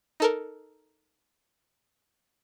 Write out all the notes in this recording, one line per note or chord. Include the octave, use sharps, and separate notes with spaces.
D#4 A4 A#4